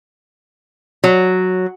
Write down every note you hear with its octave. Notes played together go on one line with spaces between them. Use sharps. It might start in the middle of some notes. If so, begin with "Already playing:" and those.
F#3